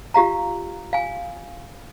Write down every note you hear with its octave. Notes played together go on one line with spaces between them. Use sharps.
F4 G4 F5 A#5
F5 G#5